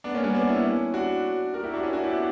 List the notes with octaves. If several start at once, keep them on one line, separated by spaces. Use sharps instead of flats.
B3 D4
A#3 C#4
G3 B3
B3 D4
C#4 E4
D4 F#4
F#4 A#4
E4 G4
D4 F#4
C#4 E4
D4 F#4
E4 G4
B3 D4